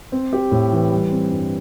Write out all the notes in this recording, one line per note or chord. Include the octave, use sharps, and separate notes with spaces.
C4
G4
A2
E3
G3
C4
G2